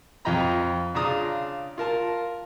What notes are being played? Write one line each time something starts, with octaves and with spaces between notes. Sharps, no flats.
F2 F4 D#5 G5 A#5 B5
C#3 D4 F4 A#5 D#6
F4 A#4 A5